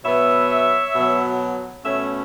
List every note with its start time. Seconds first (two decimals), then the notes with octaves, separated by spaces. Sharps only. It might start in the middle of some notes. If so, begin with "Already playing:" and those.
0.04 B2 F#3 B3 C#5 E5
0.95 B2 F#3 B3
1.85 B2 A3 C#4 C#5 E5